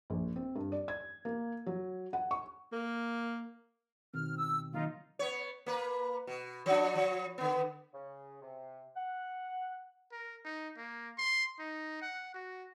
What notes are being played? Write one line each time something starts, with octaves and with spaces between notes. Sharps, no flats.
A#1
C4
G2
D5
G#6
A#3
F#3
F#5
C#6
A#3
B2 D#3 C4 F6
E6
D#3 F#3 A#3 D#4 F4
B3 C#5
A#3 B4
B2
F3 D4
F3
D3 B3
C#3
C3
F#5
A#4
D#4
A#3
C6
D#4
F#5
F#4